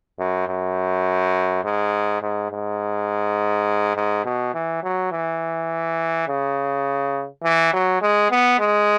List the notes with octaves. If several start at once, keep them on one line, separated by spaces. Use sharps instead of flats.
F#2
F#2
G#2
G#2
G#2
G#2
B2
E3
F#3
E3
C#3
E3
F#3
G#3
B3
G#3